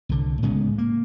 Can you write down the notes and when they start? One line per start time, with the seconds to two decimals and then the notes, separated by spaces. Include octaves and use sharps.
0.09 C2 D3
0.42 A2 C#3 G#3 B3
0.78 A#3